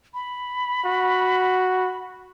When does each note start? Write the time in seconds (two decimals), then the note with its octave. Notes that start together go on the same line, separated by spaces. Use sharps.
0.14 B5
0.85 F#4